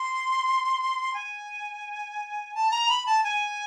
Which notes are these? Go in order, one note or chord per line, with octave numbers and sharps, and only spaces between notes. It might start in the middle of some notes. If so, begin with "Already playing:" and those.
Already playing: C6
G#5
A5
A#5
B5
A5
G#5